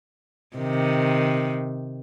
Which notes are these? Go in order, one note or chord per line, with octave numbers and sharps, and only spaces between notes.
C3 D#3